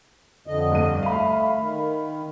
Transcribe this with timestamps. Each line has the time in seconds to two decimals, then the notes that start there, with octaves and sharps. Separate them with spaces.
0.47 F2 D3 D#5
0.72 G2 D#7
1.03 A3 F5 B5
1.59 D#3